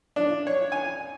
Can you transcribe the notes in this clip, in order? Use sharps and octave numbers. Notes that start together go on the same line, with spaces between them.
D4
C#5
G#5